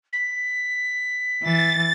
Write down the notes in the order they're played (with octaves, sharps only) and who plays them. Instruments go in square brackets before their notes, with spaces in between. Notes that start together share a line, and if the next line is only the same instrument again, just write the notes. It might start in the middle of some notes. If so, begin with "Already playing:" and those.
[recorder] B6
[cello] E3 [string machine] A6